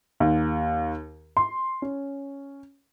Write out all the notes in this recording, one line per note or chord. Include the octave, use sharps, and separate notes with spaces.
D#2
C6
C#4